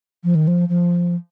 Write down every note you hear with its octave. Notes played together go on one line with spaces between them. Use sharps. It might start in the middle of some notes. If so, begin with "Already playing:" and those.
F3
D#3
F3
F3